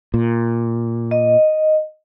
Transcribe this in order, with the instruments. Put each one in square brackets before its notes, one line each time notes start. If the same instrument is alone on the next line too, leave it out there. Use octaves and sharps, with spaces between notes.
[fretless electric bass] A#2
[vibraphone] D#5